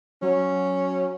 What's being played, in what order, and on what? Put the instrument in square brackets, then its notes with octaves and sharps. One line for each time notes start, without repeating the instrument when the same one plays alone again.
[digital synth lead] F#3 [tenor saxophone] C#4